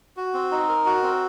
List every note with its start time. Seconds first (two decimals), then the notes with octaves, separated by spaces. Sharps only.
0.17 F#4
0.34 C4
0.51 D#4
0.68 A#4
0.86 F#4
1.03 C4